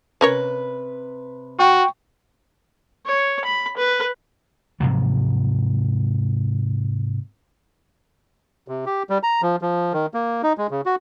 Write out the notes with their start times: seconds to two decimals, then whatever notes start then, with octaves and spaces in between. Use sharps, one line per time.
0.21 C3 C#4 A#4 B4 C#5
1.59 F#4 G5 C#6
3.06 C#5
3.45 B5
3.77 B4
4.80 G#2 C3 F3 F#3
8.68 C3
8.86 G4
9.10 G3
9.23 A#5
9.42 F3
9.62 F3
9.93 D#3
10.14 A#3
10.43 D#4
10.58 G#3
10.71 C#3
10.86 F#4